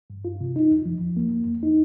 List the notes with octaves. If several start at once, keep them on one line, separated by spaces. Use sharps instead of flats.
G2
F4
C3
D#4
F2
F3
F2
A#3
F2
F2
D#4